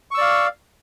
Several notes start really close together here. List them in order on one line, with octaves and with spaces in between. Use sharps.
C#6 E6 D5 F5